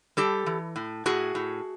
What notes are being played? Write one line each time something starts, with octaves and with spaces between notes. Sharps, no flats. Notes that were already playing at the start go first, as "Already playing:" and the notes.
G3 G4 A4
E3
A2
A2 F#4 G#4
A2